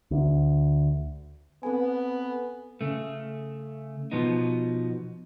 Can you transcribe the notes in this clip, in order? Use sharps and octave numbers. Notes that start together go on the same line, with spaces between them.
D2
B3 C4 A4 G#5
C#3 A3
B2 F3 B3 D#4